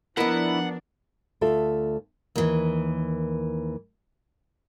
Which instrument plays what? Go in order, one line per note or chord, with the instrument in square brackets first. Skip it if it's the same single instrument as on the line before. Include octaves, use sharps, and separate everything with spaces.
[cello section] F3 D4 [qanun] B3 A#4 [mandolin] E4 D#5 [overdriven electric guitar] F#5
[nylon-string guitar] D2 F4 A4 E5
[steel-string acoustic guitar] D#2 E3